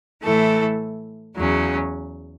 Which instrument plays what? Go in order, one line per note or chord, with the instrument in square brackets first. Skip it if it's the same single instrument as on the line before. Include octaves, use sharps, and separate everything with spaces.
[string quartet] A2 E3 A3 E4 A4
E2 C#3 F#3 C#4